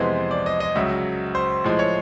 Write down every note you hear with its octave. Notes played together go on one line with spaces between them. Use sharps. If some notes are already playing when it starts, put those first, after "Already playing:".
Already playing: F2 C3 E3 G#3 B3 C5
D5
D#5
D#5
C#2 C#3 F#3 E5
C5
A2 F3 G#3
C#5